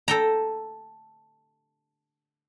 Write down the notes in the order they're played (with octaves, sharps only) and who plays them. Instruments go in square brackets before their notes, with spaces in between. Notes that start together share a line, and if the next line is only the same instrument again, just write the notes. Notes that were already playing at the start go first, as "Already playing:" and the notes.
[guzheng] A4 G5 A#5